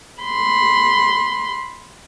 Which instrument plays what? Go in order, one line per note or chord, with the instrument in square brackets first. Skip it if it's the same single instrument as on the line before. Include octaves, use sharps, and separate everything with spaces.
[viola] B5 C6